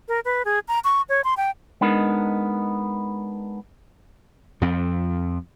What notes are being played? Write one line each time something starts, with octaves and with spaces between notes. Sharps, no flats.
A#4
B4
G#4
A#5
C#6
C#5
C6
G5
G#3 B3 D4 D#4 A#4
F2 F3 C4